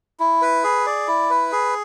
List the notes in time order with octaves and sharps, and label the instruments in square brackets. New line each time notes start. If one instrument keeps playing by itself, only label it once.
[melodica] E4
B4
G#4
D5
E4
B4
G#4